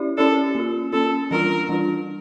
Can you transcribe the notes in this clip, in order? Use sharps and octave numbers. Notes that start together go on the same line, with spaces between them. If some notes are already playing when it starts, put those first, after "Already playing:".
Already playing: C#4 E4 G4 D5
C#4 E4 G4 A4 D5
A#3 C#4 F4
A#3 C#4 F4 A4
E3 G3 D4 F4 A#4
E3 G3 D4 F4